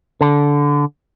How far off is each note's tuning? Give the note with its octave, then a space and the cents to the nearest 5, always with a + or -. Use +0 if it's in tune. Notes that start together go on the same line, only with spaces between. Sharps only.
D3 -15